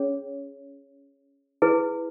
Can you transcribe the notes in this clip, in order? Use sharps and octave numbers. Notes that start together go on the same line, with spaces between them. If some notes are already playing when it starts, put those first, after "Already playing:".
Already playing: C#4 G#4 C#5
E4 G#4 B4